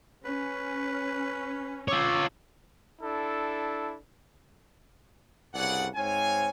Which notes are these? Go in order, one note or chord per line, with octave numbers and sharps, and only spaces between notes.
C#4 B4
F4 C#5 D6 E6
D4 E4 A4
C2 G2 C#3 G#4 D5 F#5
G#2 C4 C#5 F5 G#5